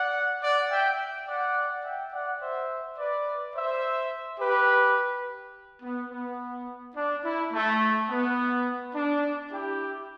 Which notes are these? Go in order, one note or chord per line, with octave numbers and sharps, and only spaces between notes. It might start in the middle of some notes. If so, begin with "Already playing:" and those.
Already playing: D5 F#5
D5 F#5
E5 G5
D5 F#5
E5 G5
D5 F#5
C5 E5
B4 D5
C5 E5
G4 B4
B3
B3
D4
E4
A3
B3
D4
E4 G4